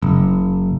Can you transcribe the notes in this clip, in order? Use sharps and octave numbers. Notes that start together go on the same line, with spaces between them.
F#1